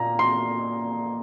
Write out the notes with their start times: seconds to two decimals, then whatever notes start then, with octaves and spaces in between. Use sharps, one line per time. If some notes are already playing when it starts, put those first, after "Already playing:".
Already playing: A#2 A#3 A#5
0.19 C6